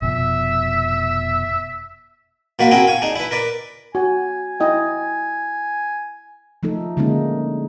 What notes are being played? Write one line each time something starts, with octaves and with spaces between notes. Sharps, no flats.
F1 B2 F3 E5
B2 A#3 F#4 B4 F5 A5
C4 C#4 E4 F#4 G#4 A#4
F5 G#5 C#6
D4 D#4 G#4
E4 B4
A#4 B4 D5
F#4 G#5
E4 D#5 G5
F3 A3 D#4 A4
D3 G#3 A#3 C#4 D#4